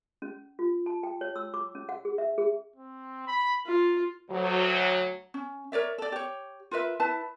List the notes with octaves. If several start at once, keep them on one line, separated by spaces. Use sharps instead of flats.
C#4
F4
A5
G5
C#5
E6
D6
C#4
F#5
G#4
E5
G#4
C4
B5
F4 A#4
D2 F#3
C#4
A#4 C#5 D5 E5
A4 D5
G4 C#5
F4 A#4 B4 E5
E4 B4 A5